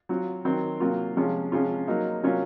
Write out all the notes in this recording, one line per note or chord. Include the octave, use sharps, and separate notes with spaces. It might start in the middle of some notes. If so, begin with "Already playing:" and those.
F#3 C4 F4
D#3 F#3 C4
C3 F#3 A#3 F4
C3 F3 G#3 C#4 F4
C3 F3 G#3 C#4 F4
F#3 A#3 D#4
C3 F#3 A#3 C#4 F4